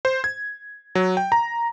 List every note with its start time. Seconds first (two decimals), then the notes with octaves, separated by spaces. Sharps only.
0.05 C5
0.24 G#6
0.95 F#3
1.17 G5
1.32 A#5